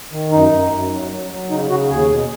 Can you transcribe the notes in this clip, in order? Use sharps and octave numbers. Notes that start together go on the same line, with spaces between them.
D#3
F#2 D#4
F#2
F#2
F#3
F#3
F#3
C#3 D#4
C#3 F#4
D#2 G#4
B2